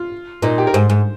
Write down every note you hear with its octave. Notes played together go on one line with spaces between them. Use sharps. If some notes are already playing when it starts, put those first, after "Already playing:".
Already playing: F4
A#2 D#4
G4
A#4
G#2 C5
G#2